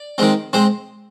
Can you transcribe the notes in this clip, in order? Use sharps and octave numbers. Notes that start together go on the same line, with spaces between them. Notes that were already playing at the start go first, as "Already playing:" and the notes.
Already playing: D5
D#3 G#3 C4
G#3 C4 C5